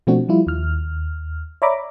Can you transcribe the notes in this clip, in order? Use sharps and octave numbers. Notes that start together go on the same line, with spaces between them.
B2 F3 A3 C4 D4 F#4
F3 G3 E4 F4
D#2 F6
C#5 D5 E5 A#5 B5 D6